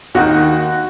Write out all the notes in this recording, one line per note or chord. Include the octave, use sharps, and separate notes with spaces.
D#2 D#3 F#4